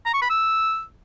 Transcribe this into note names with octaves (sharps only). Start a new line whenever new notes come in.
A#5
C#6
B5
E6